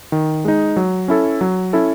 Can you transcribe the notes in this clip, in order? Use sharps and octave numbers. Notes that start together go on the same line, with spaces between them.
D#3
G#3 D#4
F#3
C#4 E4 A4
F#3
C#4 E4 A4